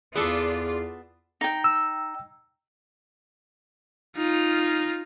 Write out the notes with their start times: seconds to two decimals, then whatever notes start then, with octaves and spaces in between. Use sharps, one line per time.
0.16 E2 B3 E4 F4 G#4 A4 D5
1.41 D#4 G5
1.64 E6
4.17 D#4 F4